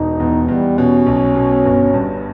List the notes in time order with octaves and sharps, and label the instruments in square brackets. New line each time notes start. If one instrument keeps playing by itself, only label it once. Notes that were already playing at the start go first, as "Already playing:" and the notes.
Already playing: [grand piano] E1 [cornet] D#4
[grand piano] E2
[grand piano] E2 [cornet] G3
[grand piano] B2 [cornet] C#4
[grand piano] B1
B2
G1
G2